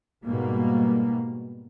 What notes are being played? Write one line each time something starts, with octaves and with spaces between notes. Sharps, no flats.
G#2 B2 G3 A#3